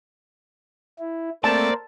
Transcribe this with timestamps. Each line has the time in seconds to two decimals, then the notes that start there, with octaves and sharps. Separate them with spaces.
0.99 E4
1.44 A3 A#3 C4 A#4 C5 D5 A5